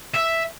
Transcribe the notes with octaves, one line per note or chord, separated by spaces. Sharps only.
E5